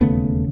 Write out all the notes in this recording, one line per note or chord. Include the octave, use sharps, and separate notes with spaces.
E1 D#2 C#3 A3 B3